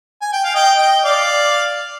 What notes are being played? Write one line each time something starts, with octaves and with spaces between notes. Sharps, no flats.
G#5
G5
F5
D#5 G5
D#5 G5
D5 F5